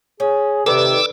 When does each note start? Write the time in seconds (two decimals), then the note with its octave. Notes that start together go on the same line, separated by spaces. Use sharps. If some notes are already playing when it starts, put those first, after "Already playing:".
0.20 C#4 G#4
0.66 C3 D#3 A4 B4 D5 D6 E6